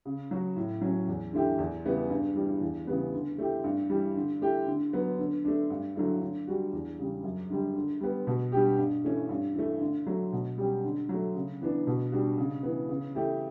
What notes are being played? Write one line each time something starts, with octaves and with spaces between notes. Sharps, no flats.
C#3
F#3 C#4 F#4
A2
F#3 C#4
E2
D3 A3 E4 G4
E2
C#3 G3 B3 E4
G2
E3 G3 D4
E2
C#3 E3 G3 B3
D3
A3 E4 G4
G2
E3 G3
D3
A3 E4 G4
D3
F#3 B3
D3
A3 D4
G2
D3 F#3 A3 E4
D3
G3 D4 F#4
E2
C#3 G3
F#2
D3 G3
D3
G3 B3
B2
G3 D4 G4
G2
E3 A3 C#4
G2
E3 A3
D3
F#3 A3
B2
G3 C#4 G4
D3
F#3 A3
C#3
E3 B3 D4
B2
G3 D4 F#4
C#3
E3 B3
C#3
E3 A3 E4 G4